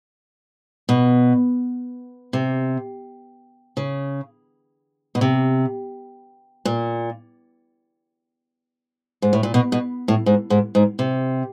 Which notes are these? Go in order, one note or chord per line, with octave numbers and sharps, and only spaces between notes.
B2
C3
C#3
B2
C3
A#2
G#2
A2
A#2
B2
B2
A2
G#2
G#2
G#2
C3